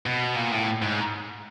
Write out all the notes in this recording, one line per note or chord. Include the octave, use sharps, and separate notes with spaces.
B2
A#2
A2
G#2